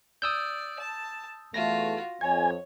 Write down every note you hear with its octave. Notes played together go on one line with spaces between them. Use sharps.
D5 D#6 E6 G6
A5
E2 A3 F4 F#4 A#6
F2 C#5 G#5